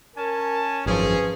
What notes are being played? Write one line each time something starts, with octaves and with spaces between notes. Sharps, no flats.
C#4 A#4 G#5 A5
G#1 F#2 F3 C#4 G#4 B4